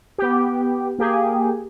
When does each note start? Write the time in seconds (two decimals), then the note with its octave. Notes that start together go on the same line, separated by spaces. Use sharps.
0.18 B3 G4
0.99 A#3 G4 G#4